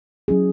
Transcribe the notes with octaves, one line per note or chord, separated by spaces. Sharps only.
F#3 C#4 E4 G#4